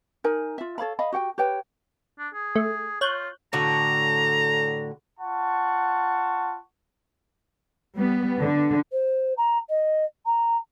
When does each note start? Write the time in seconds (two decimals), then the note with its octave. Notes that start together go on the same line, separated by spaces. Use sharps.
0.24 D#4 A#4 G#5
0.58 F4 E5
0.78 A4 C#5 F5 B5
0.99 D#5 F5 B5
1.12 F#4 G4 F#5 G5
1.38 G4 B4 C#5 G5
2.19 D4
2.34 G#4
2.55 A3
3.01 F4 C#5 F#6 G6
3.53 A2 D3 F#4 A#5
5.20 F4 F#5 A5 C#6
7.96 G3 B3
8.40 D3
8.92 C5
9.37 A#5
9.69 D#5
10.26 A#5